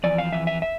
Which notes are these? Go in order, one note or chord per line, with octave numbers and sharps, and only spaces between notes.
F2 E3 D5
F5
F2 E3 E5
E5
E5